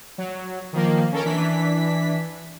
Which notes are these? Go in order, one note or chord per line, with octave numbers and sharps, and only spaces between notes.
F#3
D#3 F3 A#3
C#4 A4 A#4
E3 D4 B6